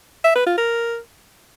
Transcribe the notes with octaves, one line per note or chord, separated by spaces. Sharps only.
E5
B4
F4
A#4